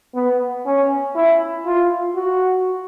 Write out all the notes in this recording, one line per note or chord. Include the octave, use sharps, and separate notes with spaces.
B3
C#4
E4
F4
F#4